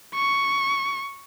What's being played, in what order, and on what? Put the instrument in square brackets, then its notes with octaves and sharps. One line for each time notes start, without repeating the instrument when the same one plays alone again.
[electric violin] C#6